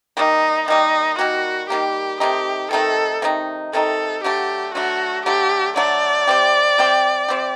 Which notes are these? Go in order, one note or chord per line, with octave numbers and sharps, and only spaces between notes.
D#3 G3 A#3 D#4
D#3 G3 A#3 D#4
D#3 G3 A#3 F#4
D#3 G3 A#3 G4
C3 D#3 A3 D#4 G4
C3 D#3 A3 D#4 A4
C3 D#3 A3 D#4
C3 D#3 A3 D#4 A4
D3 F#3 A3 G4
D3 F#3 A3 F#4
D3 F#3 A3 G4
D3 F#3 A3 D5
C3 G3 C4 G4
C3 G3 C4 G4
C3 G3 C4 G4